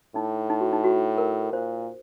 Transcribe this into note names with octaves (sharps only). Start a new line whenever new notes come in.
A2 D#4
D#4
F#4
D#4
F#4
A#4
A#2 C5